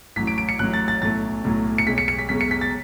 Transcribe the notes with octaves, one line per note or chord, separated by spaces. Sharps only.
A1 A2 F#3 B6
D7
D7
C#7
A1 A2 F#3 F#6
A6
A6
B1 A2 F#3 A3 A6
B1 A2 F#3 A3
C#7
B1 B2 G#3 B6
C#7
C#7
B6
B1 B2 G#3 B6
C#7
B6
A6